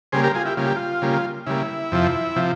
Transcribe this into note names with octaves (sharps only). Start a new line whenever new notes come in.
C#3 G3 A#3 G#4 C5
G4 A#4
F4 G#4
E4 G4
C#3 G3 A#3 F4
G4
F4
C#3 G3 A#3
C#3 G3 A#3 E4
F2 C3 F3
C3 F3